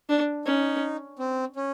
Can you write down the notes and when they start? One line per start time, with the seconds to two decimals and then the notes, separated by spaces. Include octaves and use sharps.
0.09 D4
0.45 C#4 D#4
1.19 C4
1.56 C#4